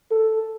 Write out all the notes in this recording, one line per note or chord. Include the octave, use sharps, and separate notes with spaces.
A4